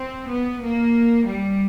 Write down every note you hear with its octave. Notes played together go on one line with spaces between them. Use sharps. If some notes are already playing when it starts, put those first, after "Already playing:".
Already playing: C4
B3
A#3
G3